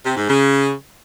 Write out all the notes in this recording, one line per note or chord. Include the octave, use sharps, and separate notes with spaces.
C3
G#2
C#3